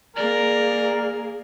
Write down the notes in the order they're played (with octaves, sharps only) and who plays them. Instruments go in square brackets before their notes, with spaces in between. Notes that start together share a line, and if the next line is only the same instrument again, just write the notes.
[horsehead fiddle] A#3 G#4 [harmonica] A#4 [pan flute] D5